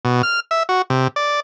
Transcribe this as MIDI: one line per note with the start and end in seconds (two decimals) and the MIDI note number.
0.05 0.22 47
0.23 0.40 89
0.51 0.63 76
0.69 0.82 66
0.90 1.08 48
1.16 1.40 74